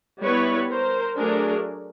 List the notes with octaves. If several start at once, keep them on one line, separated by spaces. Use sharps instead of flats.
G3 B3 E4 B4 C#5
A#4 C5
F#3 A3 D4 G#4 A#4